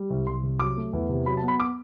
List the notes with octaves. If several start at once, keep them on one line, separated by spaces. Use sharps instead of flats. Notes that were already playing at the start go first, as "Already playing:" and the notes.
Already playing: G3
C2
C2 C6
C3
F#3 D6
A3
E2
C3
F#3 B5
A5
B3
B5
D6